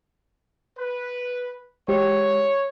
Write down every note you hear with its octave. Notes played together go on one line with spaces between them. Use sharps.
B4
G#3 G4 C5 C#5